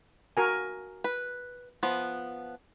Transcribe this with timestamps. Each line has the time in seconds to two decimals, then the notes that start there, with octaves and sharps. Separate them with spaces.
0.37 F#4 A#4 G#5
1.04 B4
1.83 F3 B3